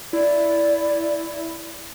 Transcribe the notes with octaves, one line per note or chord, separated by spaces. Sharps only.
E4 D5